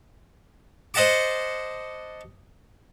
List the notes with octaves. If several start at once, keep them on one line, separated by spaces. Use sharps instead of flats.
C5 D#5 F#5 A5 D6